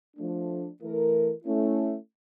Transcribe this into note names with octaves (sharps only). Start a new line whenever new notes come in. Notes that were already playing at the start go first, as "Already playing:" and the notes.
F3 A3 D4
E3 A3 E4 A#4
A3 C#4 E4